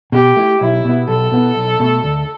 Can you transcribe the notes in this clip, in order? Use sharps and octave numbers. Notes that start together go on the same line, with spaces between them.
B2 G4
A3 E4
B1 E4
B2 B3
B1 A4
B2 B3 E4
B1
B2 A3
D2